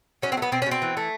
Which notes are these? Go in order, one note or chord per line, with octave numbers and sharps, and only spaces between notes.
F#3 C#4
C4
A3
B3
B2 C4
C#4
B2
C4
E3
A3